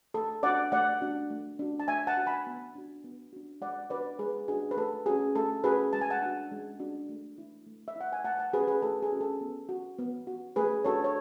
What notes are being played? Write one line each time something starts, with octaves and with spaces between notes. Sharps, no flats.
A3 A4
D4 F#4 D5 F#5
A3 D5 F#5
D4 F#4
A3
D4 F#4
A5
A3 E5 G#5
F#5 A5
D4 F#4
G#5 B5
B3
D4 F#4
B3
D4 F#4
G#3 D5 F#5
D4 F#4 B4 D5
G#3 G#4 B4
D4 F#4 G#4
B4
A3 A4
C#4 F#4 G#4
A3 A4
C#4 F#4 G#4 B4
G#3 A5
G#5
F#5 A5
D4 F#4
G#3
D4 F#4
A3
E4
A3
E5
E4 F#5
G#5
A3 F#5 A5
F#5 A5
C#4 F#4 G#4 B4
G#4 B4
A3 A4
G#4
C#4 F#4
A4
B3
F#4
B3
F#4
A3 G#4 B4
D4 F#4 A4 C#5
C#5